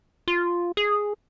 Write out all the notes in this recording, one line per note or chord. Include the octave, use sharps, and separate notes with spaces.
F4
G#4